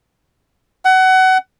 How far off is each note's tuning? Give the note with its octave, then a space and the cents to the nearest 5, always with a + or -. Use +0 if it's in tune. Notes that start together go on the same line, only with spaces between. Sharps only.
F#5 +25